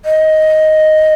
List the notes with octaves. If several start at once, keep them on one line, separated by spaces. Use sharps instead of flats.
D#5